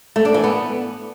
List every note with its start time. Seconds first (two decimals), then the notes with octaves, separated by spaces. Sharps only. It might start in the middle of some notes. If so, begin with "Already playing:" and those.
0.16 A3
0.25 D4
0.34 E3
0.44 B3